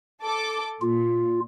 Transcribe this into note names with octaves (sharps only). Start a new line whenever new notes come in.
A4 D6
A#2 F4